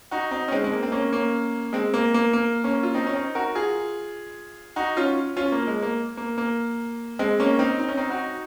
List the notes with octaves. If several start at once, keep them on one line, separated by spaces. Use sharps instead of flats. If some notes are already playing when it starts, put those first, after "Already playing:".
D#4 F#4
C4 D#4
C#4
G#3 C4
G#3
A#3
C4
A#3 C#4
A#3 C#4
G#3 C4
A#3
A#3
A#3
A#3 C#4
F4
C4 D#4
C#4
C4 D#4
F#4 A#4
F4 G#4
D#4 F#4
C#4 F4
C#4 F4
A#3
G#3
A#3
A#3
A#3
G#3 C4
A#3 C#4
C4 D#4
D#4
C#4
C4 D#4
D#4 F#4